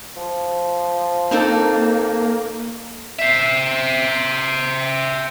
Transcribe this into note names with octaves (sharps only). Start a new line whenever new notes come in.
F3
A#3 C4 D#4 A4
C5 E5